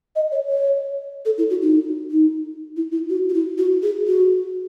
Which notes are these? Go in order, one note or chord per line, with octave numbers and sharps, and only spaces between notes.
D#5
C#5
C#5
A4
E4
F#4
D#4
D#4
E4
E4
F#4
F#4
E4
F#4
G#4
F#4